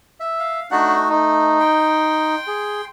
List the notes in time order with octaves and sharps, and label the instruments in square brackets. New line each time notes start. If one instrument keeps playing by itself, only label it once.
[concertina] E5
[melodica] F5
[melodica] A3 D#4 F#4 [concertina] D4 F#5 F#6
[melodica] A3 [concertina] D#4
[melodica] G5 C6
[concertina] G#4